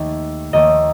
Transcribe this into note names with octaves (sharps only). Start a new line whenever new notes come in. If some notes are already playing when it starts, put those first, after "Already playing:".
Already playing: D#2 D#3 A3
D#2 D#3 A3 D#5